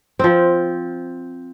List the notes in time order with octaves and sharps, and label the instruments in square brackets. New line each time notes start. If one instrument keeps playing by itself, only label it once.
[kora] F3 C4